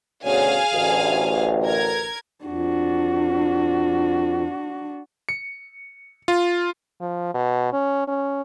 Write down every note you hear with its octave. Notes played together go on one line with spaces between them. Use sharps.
D2 B2 C#4 G#4 F5 G#5
A1 D2
A#4 G#6
F2 D4 F#4
C#7
F4
F3
B2
C#4
C#4